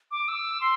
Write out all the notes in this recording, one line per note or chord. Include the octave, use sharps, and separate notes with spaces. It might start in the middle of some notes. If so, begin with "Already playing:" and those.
D6
E6
C6